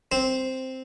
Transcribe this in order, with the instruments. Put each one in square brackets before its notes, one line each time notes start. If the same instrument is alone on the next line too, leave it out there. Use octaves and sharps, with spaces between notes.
[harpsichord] C4 C5